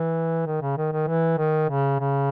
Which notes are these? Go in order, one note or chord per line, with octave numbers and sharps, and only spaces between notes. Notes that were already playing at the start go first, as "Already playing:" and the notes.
Already playing: E3
D#3
C#3
D#3
D#3
E3
D#3
C#3
C#3